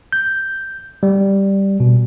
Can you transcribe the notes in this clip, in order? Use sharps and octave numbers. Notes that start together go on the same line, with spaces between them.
G6
G3
B2